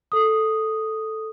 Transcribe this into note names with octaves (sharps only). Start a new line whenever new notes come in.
A4 D#6